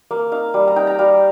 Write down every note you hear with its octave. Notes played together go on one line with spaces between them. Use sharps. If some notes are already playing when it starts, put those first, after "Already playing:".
A#3 F5
D#4 F5
G3
A#5
D#4 G5
A#5
G3 F5